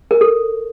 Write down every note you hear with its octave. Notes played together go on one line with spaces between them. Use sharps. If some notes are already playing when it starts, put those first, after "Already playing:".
A#4
A4